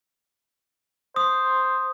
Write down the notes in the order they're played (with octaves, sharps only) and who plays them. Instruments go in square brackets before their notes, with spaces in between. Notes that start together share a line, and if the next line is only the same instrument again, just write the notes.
[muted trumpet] C5 [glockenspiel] D#6